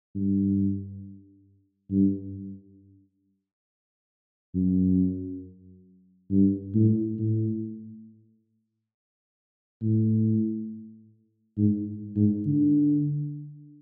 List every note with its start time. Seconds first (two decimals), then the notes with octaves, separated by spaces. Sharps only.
0.15 G2
1.91 G2
4.55 F#2
6.31 G2
6.74 A2
7.19 A2
9.82 A2
11.58 G#2
12.16 G#2
12.46 D3